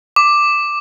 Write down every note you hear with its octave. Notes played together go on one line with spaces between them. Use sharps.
D6